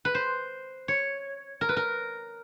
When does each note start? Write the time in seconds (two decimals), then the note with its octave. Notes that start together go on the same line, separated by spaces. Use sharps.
0.05 B4
0.15 C5
0.88 C#5
1.61 A#4
1.69 B4
1.77 A#4